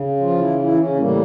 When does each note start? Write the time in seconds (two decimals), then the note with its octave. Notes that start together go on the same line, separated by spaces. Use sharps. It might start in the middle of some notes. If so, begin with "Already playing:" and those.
Already playing: C#3
0.20 F3 F4
0.39 E3 E4
0.58 E3 E4
0.77 C#3 C#4
0.96 A2 E3 G3 A#3